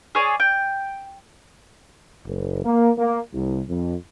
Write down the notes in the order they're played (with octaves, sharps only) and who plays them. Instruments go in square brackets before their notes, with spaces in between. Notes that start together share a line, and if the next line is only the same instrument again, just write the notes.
[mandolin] G#4 C#5 D5
G5
[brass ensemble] F#1
A#3
A#3
C2
F2